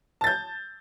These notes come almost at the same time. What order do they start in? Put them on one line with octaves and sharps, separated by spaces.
A5 A6 G6